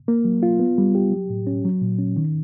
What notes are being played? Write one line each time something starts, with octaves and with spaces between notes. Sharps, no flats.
A#3
F#3
F4
B3
G3
G4
F#3
A2
C#4
F#3
A#2
C#4
D#3